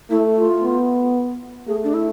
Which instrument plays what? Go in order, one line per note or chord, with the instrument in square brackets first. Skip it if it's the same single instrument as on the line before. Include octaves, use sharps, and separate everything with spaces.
[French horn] A3 [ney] E4
[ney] F4
[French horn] B3
[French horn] A3 [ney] G#4
[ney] D4
E4